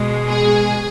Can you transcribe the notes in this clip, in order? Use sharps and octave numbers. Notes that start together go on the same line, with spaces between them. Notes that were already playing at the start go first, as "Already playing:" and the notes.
Already playing: B2 G#3
G#4